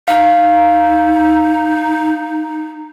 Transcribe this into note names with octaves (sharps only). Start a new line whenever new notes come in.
D#4 F5